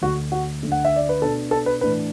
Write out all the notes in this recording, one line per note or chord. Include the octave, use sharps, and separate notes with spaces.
D2 D3 A3 F#4 F#5
F#4 F#5
D2 D3 A3 D4
F#5
E5
D5
B4
B2 B3 D4 A4
A4
B4
A2 E3 D4 B4